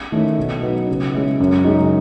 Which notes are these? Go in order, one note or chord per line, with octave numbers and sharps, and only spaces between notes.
D#3 A3 C#4 E4
B2
F#3 B3 D#4
C#3
G#3 C#4 E4
F#2
C#3 G#3 D#4